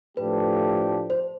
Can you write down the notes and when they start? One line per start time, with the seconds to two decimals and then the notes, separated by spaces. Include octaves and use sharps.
0.17 A2 F3 A3 D4 G4 B4
1.10 C5